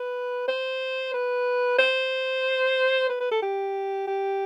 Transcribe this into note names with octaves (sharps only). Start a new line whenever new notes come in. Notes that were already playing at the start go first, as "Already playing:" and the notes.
Already playing: B4
C5
B4
C5
B4
B4
A4
G4
G4